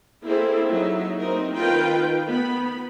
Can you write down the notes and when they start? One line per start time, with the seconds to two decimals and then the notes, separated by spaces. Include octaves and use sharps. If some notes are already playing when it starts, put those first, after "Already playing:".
0.25 A#3 C4 E4 G#4 A4
0.69 F#3 D#4 E5
1.21 A#3 C4 D#4 A#4
1.55 D#3 F4 A#4 B4 G5
2.26 B3 B5